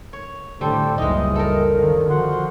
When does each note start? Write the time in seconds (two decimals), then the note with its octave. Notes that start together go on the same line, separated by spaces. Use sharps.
0.13 C#5
0.61 A2 D3 G3 G4 A4 C5
0.98 F#1 C#2 E3 G3 G#3 D#4 D#5
1.35 A4 A#4
1.75 D3 D#3 F3
2.10 F3 F#4 F#5 C6